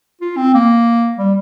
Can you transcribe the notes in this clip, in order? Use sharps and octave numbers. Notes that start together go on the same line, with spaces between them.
F4
C4
A#3
G3